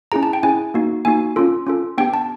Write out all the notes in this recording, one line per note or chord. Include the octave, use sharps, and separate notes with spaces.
C#4 E4 G#4 A#5
A5
G5
C#4 E4 G#4 G#5
A#3 D#4 F#4
A#3 D#4 F#4 G#5
C#4 F4 A4
C#4 F4 A4
B3 D4 G4 G5
A5